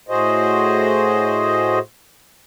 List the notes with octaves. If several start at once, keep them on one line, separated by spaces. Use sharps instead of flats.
A2 F#4 G#4 C5 D#5